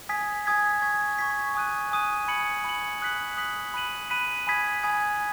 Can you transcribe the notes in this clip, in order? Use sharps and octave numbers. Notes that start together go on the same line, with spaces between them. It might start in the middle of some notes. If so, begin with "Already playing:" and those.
G#5 D#6 G#6 B6
G#5 D#6 G#6 B6
C#6 G#6 B6
C#6 G#6 B6
G#5 D#6 F#6 D#7
G#5 D#6 F#6 D#7
B5 G#6 C#7 F#7
B5 G#6 C#7 F#7
D#6 F#6 B6 F#7
D#6 F#6 B6 F#7
B5 F#6 B6 D#7 F#7
B5 F#6 B6 D#7 F#7
G#5 B5 D#6 G#6 B6
G#5 B5 D#6 G#6 B6